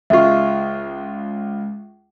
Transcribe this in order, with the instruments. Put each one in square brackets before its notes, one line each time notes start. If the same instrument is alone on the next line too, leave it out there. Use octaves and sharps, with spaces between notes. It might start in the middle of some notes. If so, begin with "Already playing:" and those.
[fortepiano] C#2 G#3 F4 [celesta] E5 C#6